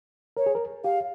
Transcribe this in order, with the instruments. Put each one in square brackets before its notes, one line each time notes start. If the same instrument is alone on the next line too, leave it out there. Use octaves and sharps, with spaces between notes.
[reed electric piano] A#4 [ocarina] C#5
[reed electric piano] G#4
A#4
[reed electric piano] G4 [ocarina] F5